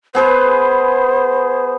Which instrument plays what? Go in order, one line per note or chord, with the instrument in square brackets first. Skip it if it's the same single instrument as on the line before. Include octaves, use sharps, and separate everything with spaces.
[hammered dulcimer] B3 G#4 B4 [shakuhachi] C5